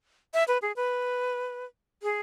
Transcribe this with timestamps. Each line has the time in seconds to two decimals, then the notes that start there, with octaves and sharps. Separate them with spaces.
0.34 E5
0.48 B4
0.62 G#4
0.76 B4
2.03 G#4